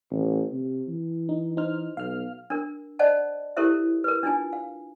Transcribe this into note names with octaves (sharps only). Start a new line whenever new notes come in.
A1
C3
E3
D#4
D#4 C5 F6
B1 F5 F6
D4 A#4
C5 D5 D#5 F#5 A5
E4 G4 A4 A#4 C5 E5
A#4 B4
D4 D#4 F4 G#5
F5